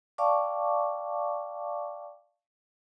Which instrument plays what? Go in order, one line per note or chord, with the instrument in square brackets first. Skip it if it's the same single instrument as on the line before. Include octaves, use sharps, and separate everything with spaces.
[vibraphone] D5 F5 G5 A5 C#6 D6